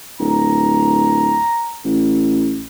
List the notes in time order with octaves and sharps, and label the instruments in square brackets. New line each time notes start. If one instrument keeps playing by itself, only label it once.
[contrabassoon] D1 [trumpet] A#5
[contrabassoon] A1